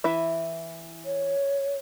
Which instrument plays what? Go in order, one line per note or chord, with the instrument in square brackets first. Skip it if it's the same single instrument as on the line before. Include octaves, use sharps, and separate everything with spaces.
[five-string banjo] E3 E4 E5
[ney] C#5